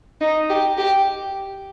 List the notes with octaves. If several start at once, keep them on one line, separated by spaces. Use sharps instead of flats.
D#4
G4
G4